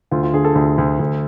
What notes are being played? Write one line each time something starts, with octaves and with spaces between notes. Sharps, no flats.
D2 F4
F4
D3 G#4
A4
D2
D2
D2